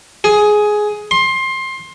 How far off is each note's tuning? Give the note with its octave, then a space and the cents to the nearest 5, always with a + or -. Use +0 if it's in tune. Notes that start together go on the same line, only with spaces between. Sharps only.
G#4 +10
C6 +20